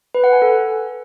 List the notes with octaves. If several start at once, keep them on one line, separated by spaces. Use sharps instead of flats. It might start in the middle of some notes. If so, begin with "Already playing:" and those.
B4
F#5
G#5
A4